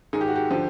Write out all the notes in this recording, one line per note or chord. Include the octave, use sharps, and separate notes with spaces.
G#2 D#3 G#4
G4
F#4
G4
D3 F3